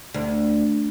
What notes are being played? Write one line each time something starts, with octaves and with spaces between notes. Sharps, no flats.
D2